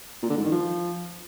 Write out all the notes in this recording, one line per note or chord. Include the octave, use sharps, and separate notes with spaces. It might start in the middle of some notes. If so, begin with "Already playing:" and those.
A#2
D3
G#2
D#3
F3